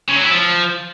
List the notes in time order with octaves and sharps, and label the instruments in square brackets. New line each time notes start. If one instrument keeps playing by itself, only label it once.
[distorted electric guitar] C#3
F#3
E4
F3